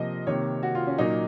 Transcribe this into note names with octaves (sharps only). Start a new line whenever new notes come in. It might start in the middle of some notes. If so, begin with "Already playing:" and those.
Already playing: C3 F3 A#3 D#5
C3 D#3 A#3 C#5
F#4
F4
C#4
A#2 F#3 A#3 D#4